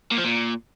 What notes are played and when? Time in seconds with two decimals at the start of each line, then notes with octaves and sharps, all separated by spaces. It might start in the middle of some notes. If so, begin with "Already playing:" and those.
0.11 A#2
0.18 F3
0.24 A#2